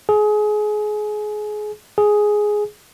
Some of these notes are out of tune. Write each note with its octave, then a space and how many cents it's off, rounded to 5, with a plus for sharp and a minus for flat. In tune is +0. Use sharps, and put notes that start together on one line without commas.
G#4 +25
G#4 +5